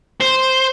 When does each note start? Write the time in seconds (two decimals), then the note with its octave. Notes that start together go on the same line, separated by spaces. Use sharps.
0.21 C5